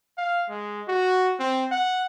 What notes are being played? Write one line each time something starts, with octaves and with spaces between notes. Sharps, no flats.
F5
G#3
F#4
C4
F#5